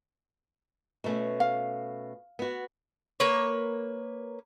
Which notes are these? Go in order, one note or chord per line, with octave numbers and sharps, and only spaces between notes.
B2 A3 C#4
F5
B3 F#4
A#3 B4 C#5